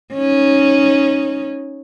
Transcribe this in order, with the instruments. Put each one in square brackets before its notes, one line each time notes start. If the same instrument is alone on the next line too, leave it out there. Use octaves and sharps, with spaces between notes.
[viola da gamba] C#4 D#4